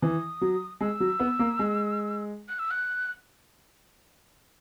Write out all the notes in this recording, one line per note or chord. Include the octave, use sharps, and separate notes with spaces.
E3 D#6
F#3
G#3 E6
F#3
B3
A#3
G#3
F#6
E6
F#6